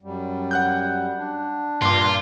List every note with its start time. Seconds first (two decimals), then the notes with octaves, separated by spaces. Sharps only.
0.02 F#2 G3
0.51 F#5 F#6 G6
1.18 D4
1.82 G2 A#2 F4 C6 D6